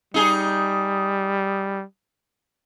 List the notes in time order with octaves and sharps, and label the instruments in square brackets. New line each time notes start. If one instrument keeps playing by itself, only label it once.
[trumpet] G3 [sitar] D#4 G#4